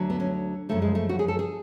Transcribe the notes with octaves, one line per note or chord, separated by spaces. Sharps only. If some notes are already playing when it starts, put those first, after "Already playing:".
Already playing: D2 D3 F#3
B3
C#4
F#2 C#3 F3 A3
G#3
A3
F#4
G#4
A4
G#4